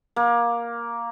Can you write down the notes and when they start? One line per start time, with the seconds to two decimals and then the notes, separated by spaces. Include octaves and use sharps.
0.16 A#3